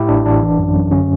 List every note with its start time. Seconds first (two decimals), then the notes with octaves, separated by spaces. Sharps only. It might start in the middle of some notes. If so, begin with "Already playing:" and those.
Already playing: A2 E4 G4
0.09 A1 D4
0.26 A1 D4
0.42 E3
0.59 F#2
0.75 F#2
0.91 D3 C#4